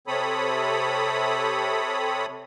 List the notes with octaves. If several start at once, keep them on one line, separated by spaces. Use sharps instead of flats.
C3 C4 A4 C#5 B5 D#6